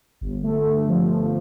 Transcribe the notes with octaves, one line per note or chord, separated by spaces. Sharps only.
G1
A3
G2
F3
G1